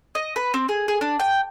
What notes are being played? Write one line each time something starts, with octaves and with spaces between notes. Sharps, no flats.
D#5
B4
C4
G#4
G#4
D4
G5